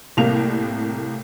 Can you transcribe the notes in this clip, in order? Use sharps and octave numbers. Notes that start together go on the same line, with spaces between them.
C2 A2 A#3 F7